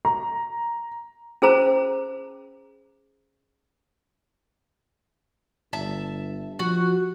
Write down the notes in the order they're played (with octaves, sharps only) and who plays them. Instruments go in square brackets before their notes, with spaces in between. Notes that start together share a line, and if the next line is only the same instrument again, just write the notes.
[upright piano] A#5
[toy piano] C#4 G#4 C5 A#5
[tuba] G1 [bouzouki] E5 A5
[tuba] F3 [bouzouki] F#4